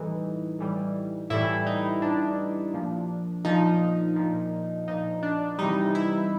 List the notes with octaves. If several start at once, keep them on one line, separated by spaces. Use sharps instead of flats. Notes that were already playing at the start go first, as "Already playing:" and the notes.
Already playing: A2 E3 G3 D#4
A2 E3 G3
A2 E3 G3 E4
D#4
A2 E3 G3 D4
A#2 F3
A#2 F3 D#4
A#2 F3
A#2 F3 D#4
D4
C3 E3 G3 D#4
E4